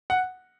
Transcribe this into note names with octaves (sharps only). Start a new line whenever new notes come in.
F#5